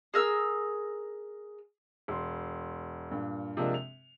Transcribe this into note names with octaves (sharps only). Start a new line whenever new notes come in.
G#4 A#4 E6
E1 C6
G2 A#2
C3 F3 G#3 A#3 D4
F7